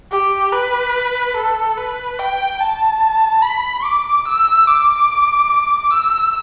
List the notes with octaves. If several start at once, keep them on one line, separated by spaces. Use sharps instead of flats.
G4
B4
A4
B4
G5
A5
B5
D6
E6
D6
E6